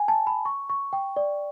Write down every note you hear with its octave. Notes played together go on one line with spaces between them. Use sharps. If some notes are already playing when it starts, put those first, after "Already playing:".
Already playing: G5 G#5
A5
B5
C#6
C#6
G5
D5